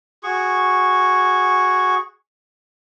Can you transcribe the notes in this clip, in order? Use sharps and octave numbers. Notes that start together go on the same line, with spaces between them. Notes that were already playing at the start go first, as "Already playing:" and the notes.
F#4 G#4 C#6